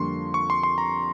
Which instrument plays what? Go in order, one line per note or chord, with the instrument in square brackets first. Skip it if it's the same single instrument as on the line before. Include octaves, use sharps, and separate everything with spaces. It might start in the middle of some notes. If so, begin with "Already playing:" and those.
Already playing: [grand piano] F2 D3 G3 A#3 [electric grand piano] C6 C#6
[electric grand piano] C#6
C6
C6
A#5